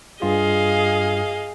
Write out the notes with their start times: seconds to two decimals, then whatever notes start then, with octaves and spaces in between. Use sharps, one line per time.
0.22 G2 F4 G#4 D#5 F5